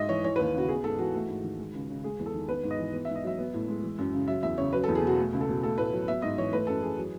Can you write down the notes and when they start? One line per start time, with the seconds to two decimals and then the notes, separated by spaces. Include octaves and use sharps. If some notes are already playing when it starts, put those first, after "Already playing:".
Already playing: G#2 G#3 D#5 E5
0.09 E3 C#5
0.24 E3 C#5
0.36 B4
0.40 D#2
0.54 C#3 F#4
0.68 B3 G#4
0.84 G#2 A4
0.99 E3 F#4
1.14 A3
1.28 G#2
1.44 D#3
1.59 G#3
1.74 C#2
1.89 C#3
2.04 G#3 G#4
2.19 E2
2.26 A4
2.34 D#3
2.49 B3 B4
2.63 G#2
2.71 D#5
2.78 E3
2.94 B3
3.05 E5
3.09 G#2
3.15 D#5
3.24 F#3 E5
3.39 B3
3.54 A2
3.68 G#3
3.83 E3
3.99 F#2
4.14 C#3
4.28 F#3 E5
4.43 E2 E5
4.58 C#3 C#5
4.73 F#3 B4
4.84 A4
4.88 E2
4.95 G#4
5.02 B2 F#4
5.18 A3
5.33 C#2
5.41 A4
5.48 B2
5.63 A3 A4
5.78 A2 B4
5.93 F#3
6.08 B3 E5
6.22 G#2 D#5
6.38 E3 C#5
6.53 A3 B4
6.67 F#2 A4
6.82 E3 G#4
6.98 F#3